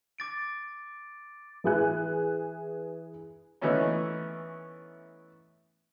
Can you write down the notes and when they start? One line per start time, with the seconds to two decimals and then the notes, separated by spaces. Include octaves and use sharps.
0.18 D6 A6 D7
1.64 E3 G#4 G#5 F#6
3.61 E3 A3 B3 C#4 D#4